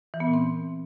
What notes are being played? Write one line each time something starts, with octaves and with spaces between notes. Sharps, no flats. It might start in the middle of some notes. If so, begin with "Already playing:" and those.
E3
B3
A#2
C4